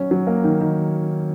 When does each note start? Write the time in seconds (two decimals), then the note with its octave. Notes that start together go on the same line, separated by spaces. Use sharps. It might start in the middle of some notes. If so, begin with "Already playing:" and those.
Already playing: F#3 C#4
0.11 F#3
0.27 A#3
0.44 D#3
0.61 D#3